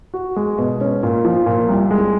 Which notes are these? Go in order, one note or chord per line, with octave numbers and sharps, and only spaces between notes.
F#4
G#3
B2
C#4
A#2
F3
A#2
C2
G#3